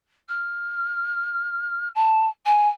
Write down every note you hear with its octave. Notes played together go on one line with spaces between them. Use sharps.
F6
A5
G#5